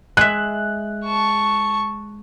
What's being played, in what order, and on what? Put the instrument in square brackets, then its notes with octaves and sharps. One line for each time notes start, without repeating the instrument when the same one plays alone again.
[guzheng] G#3 E5 [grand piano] F#6
[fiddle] A5 C#6